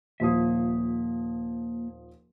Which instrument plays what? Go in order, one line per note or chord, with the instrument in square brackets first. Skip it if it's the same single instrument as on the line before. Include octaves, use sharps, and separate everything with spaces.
[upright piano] D#1 F3 D#6 [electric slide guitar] A#3 E5